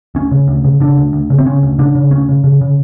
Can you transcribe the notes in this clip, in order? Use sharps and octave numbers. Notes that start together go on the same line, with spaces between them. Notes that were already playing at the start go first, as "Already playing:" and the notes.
D2 C#4
C#3
D2
C#3
C#3 D4
D2
D2
C#3
C4
C#3 C#4
D2
C#3 D4
C#3
D2 C#4
C#3
C#3
C#3